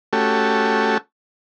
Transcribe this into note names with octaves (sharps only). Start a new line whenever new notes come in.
A3 C#4 F#4 G4 A4